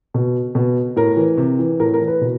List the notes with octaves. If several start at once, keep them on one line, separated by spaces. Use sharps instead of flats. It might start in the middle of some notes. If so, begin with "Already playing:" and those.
B2
B2
A2 A#4
E3
C3
E3
A2 A#4
A#4
E3
B4
B2